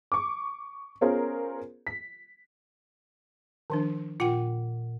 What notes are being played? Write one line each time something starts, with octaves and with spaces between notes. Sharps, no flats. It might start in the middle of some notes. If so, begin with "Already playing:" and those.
C#6 D6
B3 C#4 F4 G#4 A#4 C5
B6
D#3 F3 D4
A#2 F4 F#5 G5